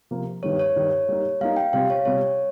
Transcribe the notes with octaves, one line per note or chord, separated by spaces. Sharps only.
C3 F3 A#3
G2 D#3 G3 C#5
C#5
G2 D#3 G3
G3 A#3 D#4
G3 A#3 D#4 F5
G5
C3 G3 C4 F4 F5
C#5
C3 G3 C4 F4 C#5